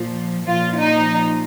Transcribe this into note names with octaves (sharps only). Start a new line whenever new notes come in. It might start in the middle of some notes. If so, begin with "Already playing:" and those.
Already playing: A#2 F3
A#2 F3 F4
D#4